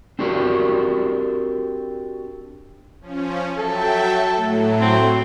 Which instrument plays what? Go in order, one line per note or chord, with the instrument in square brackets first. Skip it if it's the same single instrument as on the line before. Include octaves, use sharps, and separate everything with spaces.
[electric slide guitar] C4 D4 F#4 G4 A#4
[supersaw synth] F3 C#4
[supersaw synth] F#3 E5 G5 [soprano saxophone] A4
[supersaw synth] A2 F#3 [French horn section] A3
[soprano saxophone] C4